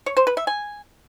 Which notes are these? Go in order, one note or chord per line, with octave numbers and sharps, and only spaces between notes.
C#5
C5
B4
E5
G#5